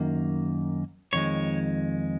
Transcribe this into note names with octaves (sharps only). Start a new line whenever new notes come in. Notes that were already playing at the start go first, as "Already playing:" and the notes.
Already playing: F#2 D#3 A#3
F2 D#3 G#3 C#5